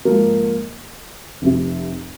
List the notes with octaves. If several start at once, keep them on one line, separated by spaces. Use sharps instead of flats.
G#2 F3 A#3
F1 F2 C3